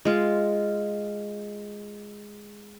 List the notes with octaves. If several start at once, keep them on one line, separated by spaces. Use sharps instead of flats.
G#3 F4